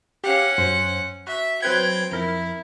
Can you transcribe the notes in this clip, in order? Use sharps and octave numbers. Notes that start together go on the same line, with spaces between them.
C#4 G4 F5 F#5
F#2 C5
F#4 E5
F#3 C4 B4 G5 G#6
F2 E4 A#4